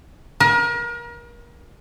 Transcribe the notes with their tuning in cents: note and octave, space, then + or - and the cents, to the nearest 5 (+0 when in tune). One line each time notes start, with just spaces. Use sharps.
A#4 +35